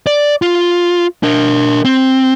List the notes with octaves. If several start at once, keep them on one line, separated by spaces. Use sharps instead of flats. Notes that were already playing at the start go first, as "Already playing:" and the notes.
D5
F4
D4 A#4
C4